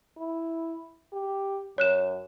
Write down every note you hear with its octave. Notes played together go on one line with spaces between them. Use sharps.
E4
G4
F#2 C#5 F#6 E7